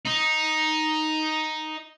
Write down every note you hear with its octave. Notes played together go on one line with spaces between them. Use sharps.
D#4